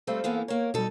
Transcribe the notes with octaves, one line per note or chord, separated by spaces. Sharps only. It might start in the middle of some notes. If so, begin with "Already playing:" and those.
G3 A3 C4 A4 C5 F5
E3 A#3 B3
A#3 A#4 C#5
B2 G3 D#4 A4